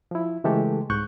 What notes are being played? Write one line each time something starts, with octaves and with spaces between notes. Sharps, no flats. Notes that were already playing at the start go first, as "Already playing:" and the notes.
F3 E4
C#3 E3 G#3 A3 G4 A4
C2 G#2 C#6 F#6 G6